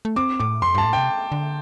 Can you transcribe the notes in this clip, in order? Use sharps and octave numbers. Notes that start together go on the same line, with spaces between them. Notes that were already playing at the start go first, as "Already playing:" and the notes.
A3
C4 D6
A2 D6
F2 C6
G2 A5
A2
C3 G5
D3